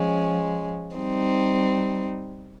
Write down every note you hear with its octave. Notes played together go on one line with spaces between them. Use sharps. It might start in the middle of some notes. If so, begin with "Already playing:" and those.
Already playing: F3 G#3 C#4
G3 C4 D#4